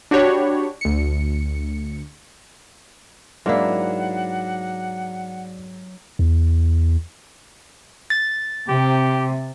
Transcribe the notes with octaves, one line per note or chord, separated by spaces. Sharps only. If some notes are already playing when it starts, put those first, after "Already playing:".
D4 F#4 G4 C#5 B5
D2 C#7
G#2 F#3 A#3 D4 E4 F#5
E2
A6
C3 G4